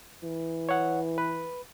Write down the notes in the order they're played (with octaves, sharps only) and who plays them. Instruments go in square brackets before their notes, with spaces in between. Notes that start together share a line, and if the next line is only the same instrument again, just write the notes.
[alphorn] E3
[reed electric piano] C#5 F#5
B4